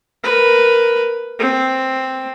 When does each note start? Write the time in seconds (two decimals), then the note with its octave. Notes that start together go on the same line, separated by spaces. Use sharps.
0.23 A#4 B4
1.39 C4